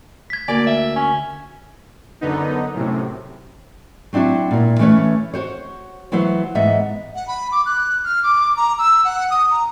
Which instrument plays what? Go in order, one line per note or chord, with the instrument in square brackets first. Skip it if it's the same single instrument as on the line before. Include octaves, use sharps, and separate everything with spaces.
[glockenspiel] G#6 B6
[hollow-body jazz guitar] D2 A#3 [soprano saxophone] D5 [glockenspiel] G#5
[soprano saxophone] E5
C#4
[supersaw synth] F#2 D3 B3 D#4
F#2 A2 C3
[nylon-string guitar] F#3 C4 D4 E4 F#4
A#2 E4
E3 A3 C#4 B4 C#5
F#4 C5 C#5
E3 F#3 B3 E4 B4 C5
G#2 E3 B3 D#5 E5
[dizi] F#5
B5
D6
F#6
F6
D6
A#5
E6
F#5
D#6
A#5